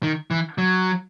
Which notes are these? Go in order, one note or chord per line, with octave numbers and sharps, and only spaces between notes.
D#3
E3
F#3